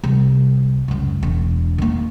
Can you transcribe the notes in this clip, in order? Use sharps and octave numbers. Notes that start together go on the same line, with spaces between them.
C2
C#2 F#2
E1
D#3 A#3